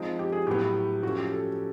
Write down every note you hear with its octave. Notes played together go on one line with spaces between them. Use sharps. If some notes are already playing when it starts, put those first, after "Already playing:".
Already playing: F3 G#3 C4 D#4
G4
G#4
A2 F#3 B3 G4
F3 A3 C#4 F#4
G4
A4